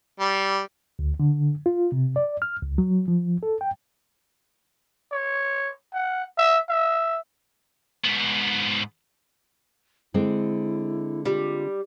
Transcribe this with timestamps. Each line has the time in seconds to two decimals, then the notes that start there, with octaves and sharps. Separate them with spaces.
0.20 G3
0.99 D2
1.20 D3
1.66 F4
1.92 C3
2.16 D5
2.42 F6
2.62 C#2
2.78 F#3
3.08 F3
3.43 A4
3.61 G5
5.12 C#5
5.94 F#5
6.38 E5
6.69 E5
8.05 G#2 B3
10.14 D3 G#3 C4 E4
11.26 G3 F4